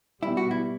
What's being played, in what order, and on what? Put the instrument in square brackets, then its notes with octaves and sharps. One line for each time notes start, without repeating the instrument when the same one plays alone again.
[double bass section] B2 G3 B3 [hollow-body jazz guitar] E4
[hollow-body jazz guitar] F#4
E4